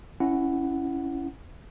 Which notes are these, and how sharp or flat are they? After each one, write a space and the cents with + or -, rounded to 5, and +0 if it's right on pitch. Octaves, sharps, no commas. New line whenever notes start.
C#4 +5 E4 +10 F#5 +0